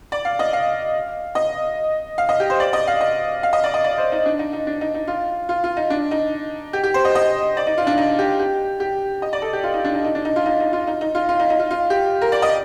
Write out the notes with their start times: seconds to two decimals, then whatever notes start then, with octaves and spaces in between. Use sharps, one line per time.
0.12 D5
0.25 F5
0.39 D#5
0.53 F5
1.35 D#5
2.18 F5
2.29 D#5
2.40 G4
2.50 C5
2.60 D5
2.73 D#5
2.87 F5
3.01 D#5
3.43 F5
3.53 D#5
3.64 D5
3.74 D#5
3.84 D5
3.98 C5
4.12 D#4
4.25 D4
4.39 D#4
4.53 D#4
4.67 D4
4.81 D#4
4.94 D#4
5.08 F4
5.49 F4
5.64 F4
5.77 D#4
5.90 D4
6.11 D#4
6.73 G4
6.83 G4
6.94 C5
7.05 D#5
7.15 D#5
7.57 D5
7.67 D#4
7.78 F4
7.87 D4
7.98 D#4
8.19 G4
8.39 G4
8.80 G4
9.22 D#5
9.33 D5
9.42 A4
9.53 G4
9.64 F4
9.74 D#4
9.84 D4
9.94 D#4
10.04 D#4
10.15 D4
10.25 D#4
10.36 F4
10.46 D#4
10.60 D#4
10.73 F4
10.87 D#4
11.01 D#4
11.15 F4
11.29 F4
11.39 D#4
11.50 D#4
11.59 F4
11.71 F4
11.90 G4
12.21 A#4
12.32 D5
12.42 D#5